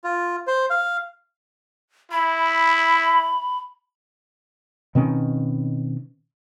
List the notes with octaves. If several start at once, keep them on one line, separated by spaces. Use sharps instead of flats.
F4
C5
F5
E4 B5
B2 D#3 C4 C#4